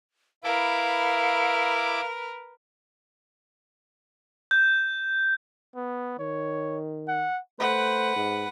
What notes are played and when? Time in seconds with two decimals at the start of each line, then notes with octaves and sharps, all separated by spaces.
0.44 E4 A#4 B4 F5 D6
4.51 G6
5.76 B3
6.19 D#3 C#5
7.08 F#5
7.60 A3 B4 C5 F#5
8.16 G#2